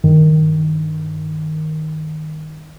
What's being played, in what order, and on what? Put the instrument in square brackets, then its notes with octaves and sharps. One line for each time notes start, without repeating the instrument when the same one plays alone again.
[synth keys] G2 D#3